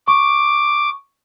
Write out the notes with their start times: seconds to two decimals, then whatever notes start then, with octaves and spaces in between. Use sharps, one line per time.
0.08 C#6 D6